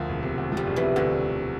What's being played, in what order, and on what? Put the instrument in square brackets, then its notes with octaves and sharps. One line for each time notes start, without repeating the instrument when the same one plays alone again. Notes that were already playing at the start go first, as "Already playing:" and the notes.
Already playing: [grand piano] D2 F3 [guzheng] A#3
[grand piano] E1
C3
D2
[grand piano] F3 [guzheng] G3
[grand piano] E1
[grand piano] C3 [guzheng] E3
[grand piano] D2 [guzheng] D3